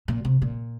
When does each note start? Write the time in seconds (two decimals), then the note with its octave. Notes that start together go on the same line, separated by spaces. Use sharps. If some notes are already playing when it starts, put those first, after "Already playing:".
0.08 A#2
0.25 C3
0.42 A#2